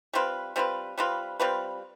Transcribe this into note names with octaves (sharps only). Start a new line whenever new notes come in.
G3 C4 F4 B4
G3 C4 F4 B4
G3 C4 F4 B4
G3 C4 F4 B4